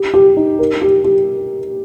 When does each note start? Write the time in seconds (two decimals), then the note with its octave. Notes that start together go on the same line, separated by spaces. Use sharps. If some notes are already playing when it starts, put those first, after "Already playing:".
Already playing: G4
0.14 G4
0.37 D#4
0.59 A#4
0.82 G4
1.04 G4